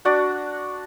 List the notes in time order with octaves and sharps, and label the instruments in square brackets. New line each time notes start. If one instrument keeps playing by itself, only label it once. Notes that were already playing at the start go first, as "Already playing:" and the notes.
[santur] D4 F#4 D5